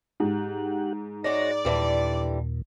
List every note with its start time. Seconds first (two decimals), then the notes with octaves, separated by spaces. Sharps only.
0.20 G#2 G4 F#5
1.24 G#3 F#4 C#5 D5 A#6
1.65 D#2 A#2 D3 E3 G3